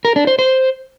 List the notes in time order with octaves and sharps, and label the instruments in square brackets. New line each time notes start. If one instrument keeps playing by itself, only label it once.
[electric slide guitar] A#4
D4
C5
C5